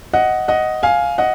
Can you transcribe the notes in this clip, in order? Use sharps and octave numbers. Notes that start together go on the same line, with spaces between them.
D#5 F#5
D#5 F#5
F5 G#5
D#5 F#5